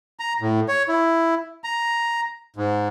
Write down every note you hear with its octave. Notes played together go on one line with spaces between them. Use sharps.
A#5
A2
C#5
E4
A#5
G#2